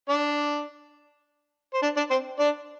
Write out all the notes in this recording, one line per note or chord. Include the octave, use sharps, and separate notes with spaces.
D4 D5
C5
D4 D5
D4 D5
C4 C5
D4 D5